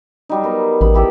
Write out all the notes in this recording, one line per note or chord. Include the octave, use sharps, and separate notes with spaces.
F#3 G3 D#4
B3 A#4
A1 B5
E4 G4 A4